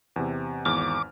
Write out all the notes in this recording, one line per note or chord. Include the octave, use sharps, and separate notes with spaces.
E2 C3
G#1 E2 D6 F6